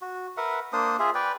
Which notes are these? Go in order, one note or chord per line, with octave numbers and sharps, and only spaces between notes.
F#4
A#4 B4 E5 F#5
A#3 D4 C5 D#6
F4 G#4 E5
B4 D5 G5